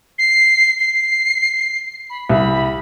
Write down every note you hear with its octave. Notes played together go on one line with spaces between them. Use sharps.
C7
C7
B5
C2 B5